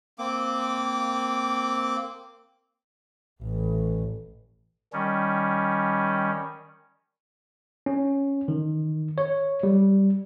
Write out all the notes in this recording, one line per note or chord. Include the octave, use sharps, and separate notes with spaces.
A#3 C4 D6
A1
D#3 G3 C#4
C#4
D#3
C#5
G3